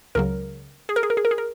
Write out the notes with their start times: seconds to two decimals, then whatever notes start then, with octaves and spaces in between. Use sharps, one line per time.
0.15 C#2 C#3 F#3 A#4
0.89 G#4
0.96 A#4
1.03 G#4
1.10 A#4
1.17 G#4
1.25 A#4
1.31 G#4
1.38 A#4